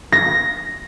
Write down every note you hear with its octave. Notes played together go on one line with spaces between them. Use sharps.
A#6